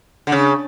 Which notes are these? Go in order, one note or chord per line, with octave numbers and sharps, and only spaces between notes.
D3
C#3